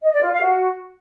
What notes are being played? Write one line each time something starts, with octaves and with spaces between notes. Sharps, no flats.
D#5
D5
F4
F5
F#4